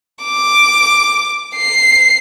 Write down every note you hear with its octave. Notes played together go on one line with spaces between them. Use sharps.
D6
C7